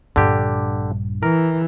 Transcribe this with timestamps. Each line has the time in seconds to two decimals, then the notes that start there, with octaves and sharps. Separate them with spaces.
0.16 A#1 G2 D3 G4
1.23 E3 A#4